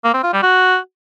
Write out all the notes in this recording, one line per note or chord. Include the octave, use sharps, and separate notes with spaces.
A#3
C4
F4
G3
F#4